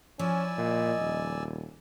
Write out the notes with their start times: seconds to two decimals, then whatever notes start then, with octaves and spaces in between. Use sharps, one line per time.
0.19 F3 C#4 E4 D5 G#5 E6
0.58 A#2 D#5
0.99 D#1